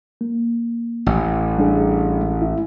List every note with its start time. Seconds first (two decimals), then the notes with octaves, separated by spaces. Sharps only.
0.21 A#3
1.06 A1
1.57 G3 D4 G#4
2.42 E4